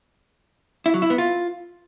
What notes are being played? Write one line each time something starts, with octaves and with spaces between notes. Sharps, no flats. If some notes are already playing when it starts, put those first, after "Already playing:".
E4
F#3
E4
B3
F4